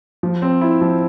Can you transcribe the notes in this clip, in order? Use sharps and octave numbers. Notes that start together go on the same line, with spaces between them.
F3
C4
E4
F3